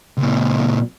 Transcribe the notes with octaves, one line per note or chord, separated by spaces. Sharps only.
C#2 A#2